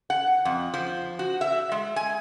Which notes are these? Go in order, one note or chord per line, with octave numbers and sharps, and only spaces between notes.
F#5
F2
F3
F#4
E5
G#3
G#5